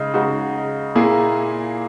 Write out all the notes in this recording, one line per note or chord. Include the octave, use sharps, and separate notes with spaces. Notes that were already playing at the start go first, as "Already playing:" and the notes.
Already playing: C#3 G#3 D#4
C#3 G#3 D#4 F#4
A#2 A#3 E4 G#4